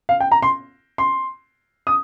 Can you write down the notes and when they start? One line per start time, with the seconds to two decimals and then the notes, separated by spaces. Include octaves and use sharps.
0.09 F5
0.20 G5
0.32 A#5
0.42 C6
0.98 C6
1.87 D#6